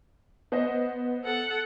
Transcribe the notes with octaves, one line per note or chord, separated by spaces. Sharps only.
B3 C5 D#5
A4 F#5